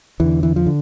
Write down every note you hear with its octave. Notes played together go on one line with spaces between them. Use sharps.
E2 D3 E3
E3
F3
D3